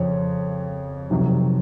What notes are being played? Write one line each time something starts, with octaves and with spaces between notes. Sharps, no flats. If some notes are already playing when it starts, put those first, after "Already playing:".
Already playing: F2 C#3 F3 C#5
F2 C3 D#3 F#3